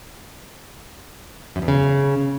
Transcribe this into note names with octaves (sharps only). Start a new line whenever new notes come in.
F#2
E2
C#3